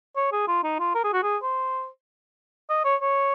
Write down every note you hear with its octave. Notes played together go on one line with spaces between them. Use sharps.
C#5
G#4
F4
D#4
F4
A#4
G#4
F#4
G#4
C5
D#5
C#5
C#5